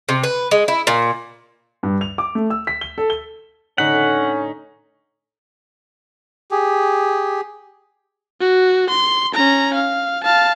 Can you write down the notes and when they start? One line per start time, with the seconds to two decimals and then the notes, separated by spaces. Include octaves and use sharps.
0.09 C3
0.24 B4
0.51 G#3
0.68 E4
0.87 A#2
1.83 G2
2.01 F7
2.18 D6
2.35 A3
2.50 E6
2.67 B6
2.81 G7
2.98 A4
3.10 G7
3.78 A2 D3 C#4 D#4 F#5 B6
6.51 G4 G#4
8.41 F#4
8.90 C6
9.35 C#4 A#5
9.74 F5
10.24 F5 A5